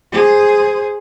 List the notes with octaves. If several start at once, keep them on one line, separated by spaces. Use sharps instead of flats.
G#4 C5